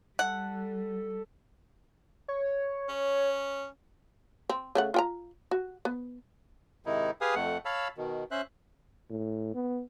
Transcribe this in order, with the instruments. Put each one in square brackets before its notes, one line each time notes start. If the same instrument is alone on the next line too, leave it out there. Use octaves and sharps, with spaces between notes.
[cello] G3 [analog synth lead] A4 [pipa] F#5
[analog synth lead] C#5
[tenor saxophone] C#4
[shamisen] C4
C#3 A3 F#5
F4 G5 A#5
F#4
B3
[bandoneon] G#2 C3 D#3 D#4 E4
G4 G#4 B4 F5 G#5 D#6
F2 A3 F#5
C#5 F5 A5 B5 E6
B2 D#3
C#4 C5 E5 F#6
[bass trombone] A2
B3